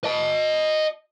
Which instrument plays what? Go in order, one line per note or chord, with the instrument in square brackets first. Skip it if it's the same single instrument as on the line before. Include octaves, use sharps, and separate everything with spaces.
[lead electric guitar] D#5 A5